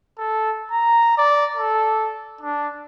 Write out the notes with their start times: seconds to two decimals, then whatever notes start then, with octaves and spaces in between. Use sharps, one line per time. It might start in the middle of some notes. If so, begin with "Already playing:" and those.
0.18 A4
0.71 A#5
1.18 D5
1.56 A4
2.41 D4